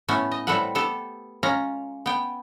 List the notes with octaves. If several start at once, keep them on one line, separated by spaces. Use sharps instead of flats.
A2 A3 B3 C#4
D#5
A2 G3 C4 A4 B4 F#5
B3 G4 A4
G#3 C#4 F4 A#5
B3 G5